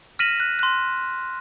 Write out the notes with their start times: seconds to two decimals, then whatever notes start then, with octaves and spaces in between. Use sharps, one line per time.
0.19 F6 A#6 B6 D#7 E7 F#7
0.40 F#6
0.59 C6 F#6